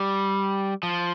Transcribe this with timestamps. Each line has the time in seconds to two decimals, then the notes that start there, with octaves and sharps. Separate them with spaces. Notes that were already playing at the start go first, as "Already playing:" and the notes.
Already playing: G3
0.83 F3